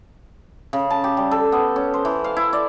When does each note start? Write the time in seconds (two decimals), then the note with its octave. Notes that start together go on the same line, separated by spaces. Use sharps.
0.73 C#3
0.90 A5
1.04 G4
1.17 G3
1.31 A4
1.52 B3
1.76 C#4
1.94 C5
2.05 E3
2.24 F5
2.37 E4
2.53 D5